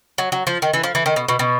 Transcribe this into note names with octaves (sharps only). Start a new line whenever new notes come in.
F#3
F#3
F3
D#3
E3
F3
E3
D#3
B2
B2
B2